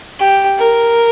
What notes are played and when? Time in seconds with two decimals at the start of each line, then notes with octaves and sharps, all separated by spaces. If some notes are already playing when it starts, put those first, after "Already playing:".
0.19 G4
0.58 A#4